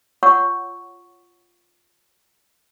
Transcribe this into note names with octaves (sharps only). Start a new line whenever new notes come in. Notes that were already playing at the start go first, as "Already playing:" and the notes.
F4 C#5 F#5 C#6 E6